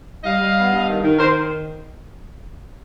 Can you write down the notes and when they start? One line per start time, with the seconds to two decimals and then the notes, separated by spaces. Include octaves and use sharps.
0.24 G3 D#5 F5
0.41 G3
0.56 B3
0.72 G2
0.88 D#3
1.03 D#3
1.19 D#3 A#4 C5